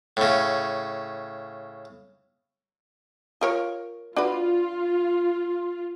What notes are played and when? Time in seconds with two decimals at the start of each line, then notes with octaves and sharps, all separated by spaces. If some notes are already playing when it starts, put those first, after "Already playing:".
0.17 A2 C#3
3.41 F4 A#4 C#5
4.16 D4 F4 F#4 B4